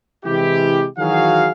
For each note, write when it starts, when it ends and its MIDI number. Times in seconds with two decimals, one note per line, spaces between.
0.25 0.86 48
0.25 0.86 52
0.25 0.86 56
0.25 0.86 64
0.25 0.86 67
0.98 1.50 51
0.98 1.50 52
0.98 1.50 54
0.98 1.50 66
0.98 1.50 68
0.98 1.50 77